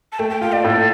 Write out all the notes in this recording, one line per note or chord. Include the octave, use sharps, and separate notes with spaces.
A5
A3 G5
G5
F4 G5
D5
A2 A4